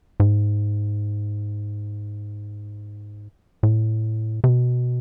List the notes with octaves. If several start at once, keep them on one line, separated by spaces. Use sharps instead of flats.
G#2
A2
C3
B2